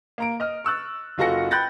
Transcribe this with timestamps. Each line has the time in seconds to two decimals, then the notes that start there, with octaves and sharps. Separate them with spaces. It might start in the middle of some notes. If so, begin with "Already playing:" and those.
0.18 A#3 A#5 D7
0.40 D#5 F6
0.64 C#6 E6 F#6 A6
1.18 F#1 F4 F#4 A4 A#6 C#7
1.51 G5 B5 F#6 G6 A6 A#6